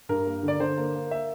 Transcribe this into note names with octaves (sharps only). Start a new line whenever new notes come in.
G2 A#4
A#3
D3
D5
D3 C5
A#3
A#3
E5